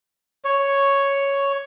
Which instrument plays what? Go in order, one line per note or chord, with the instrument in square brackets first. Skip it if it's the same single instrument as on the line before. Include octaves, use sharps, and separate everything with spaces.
[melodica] C#5